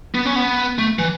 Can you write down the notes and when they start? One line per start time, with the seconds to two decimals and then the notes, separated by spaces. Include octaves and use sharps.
0.15 B3
0.25 C#4
0.36 B3
0.78 A3
0.99 E3